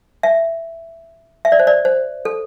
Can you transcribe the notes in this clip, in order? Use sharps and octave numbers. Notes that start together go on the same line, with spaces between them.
E5
E5
D5
C5
D5
C5
A4